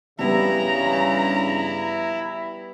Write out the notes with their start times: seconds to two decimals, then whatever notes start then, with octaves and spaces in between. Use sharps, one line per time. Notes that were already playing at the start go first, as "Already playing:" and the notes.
0.19 G2 C#3 G3 B3 E4 A#5